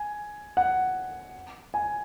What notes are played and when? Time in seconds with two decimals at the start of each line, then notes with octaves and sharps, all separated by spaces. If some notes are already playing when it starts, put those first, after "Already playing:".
Already playing: G#5
0.57 F#5
1.74 G#5